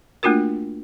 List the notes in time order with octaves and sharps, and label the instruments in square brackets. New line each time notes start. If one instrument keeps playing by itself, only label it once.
[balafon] A3 A#3 D4 F4 F#4 A#4